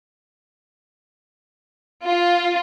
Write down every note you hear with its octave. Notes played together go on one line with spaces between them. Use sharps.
F4